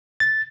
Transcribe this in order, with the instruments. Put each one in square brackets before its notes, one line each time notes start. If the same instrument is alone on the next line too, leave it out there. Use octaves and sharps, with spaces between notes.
[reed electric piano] A6